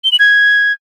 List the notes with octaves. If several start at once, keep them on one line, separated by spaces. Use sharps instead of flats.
G7
F#7
G#6